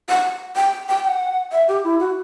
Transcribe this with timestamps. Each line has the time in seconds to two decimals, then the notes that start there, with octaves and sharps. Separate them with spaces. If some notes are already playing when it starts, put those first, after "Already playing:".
0.09 F#5
0.56 G5
0.88 G5
1.04 G5
1.08 F#5
1.52 E5
1.68 G4
1.84 E4
2.00 F#4